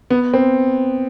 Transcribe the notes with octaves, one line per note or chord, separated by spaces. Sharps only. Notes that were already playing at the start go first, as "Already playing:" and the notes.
B3
C4